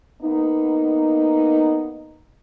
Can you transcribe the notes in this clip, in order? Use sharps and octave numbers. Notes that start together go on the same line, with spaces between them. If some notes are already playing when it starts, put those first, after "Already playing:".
A#3 B3 D#4